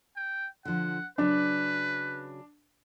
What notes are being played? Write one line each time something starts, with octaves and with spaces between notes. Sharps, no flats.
G5
D3 F3 F#5
C#3 F#3 D4 B4